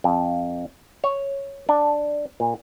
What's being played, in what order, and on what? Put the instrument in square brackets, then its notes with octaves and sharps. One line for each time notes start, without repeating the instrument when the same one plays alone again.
[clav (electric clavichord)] F2
C#5
D4
A#2